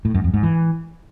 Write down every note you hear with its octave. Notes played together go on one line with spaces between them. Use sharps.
A2
F#2
F2
G#2
E3